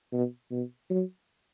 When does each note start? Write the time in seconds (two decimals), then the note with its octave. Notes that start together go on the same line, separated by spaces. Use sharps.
0.13 B2
0.51 B2
0.90 F#3